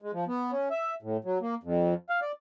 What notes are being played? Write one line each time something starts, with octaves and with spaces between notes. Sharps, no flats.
G#3
F3
B3
C#4
E5
A2
F#3
A#3
F2
F5
D5